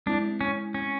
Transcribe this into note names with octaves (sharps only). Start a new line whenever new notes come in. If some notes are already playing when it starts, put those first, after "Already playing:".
G#3 C4 D4 E4
C#4
C#4